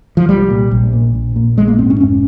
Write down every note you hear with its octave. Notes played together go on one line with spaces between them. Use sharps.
F3
C2 G3
A#2
A#1
A#2
A#1
A#2
A#1 G#3
A#3
G#2 C4
C#4
F1 C#4